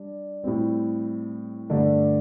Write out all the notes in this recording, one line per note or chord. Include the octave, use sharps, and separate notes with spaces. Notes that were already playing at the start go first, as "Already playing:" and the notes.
Already playing: G3 D4
A2 G3 C4
G2 D3 A3 D4